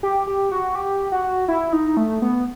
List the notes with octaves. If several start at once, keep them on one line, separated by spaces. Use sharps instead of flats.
G4
G4
F#4
G4
F#4
E4
D#4
A3
B3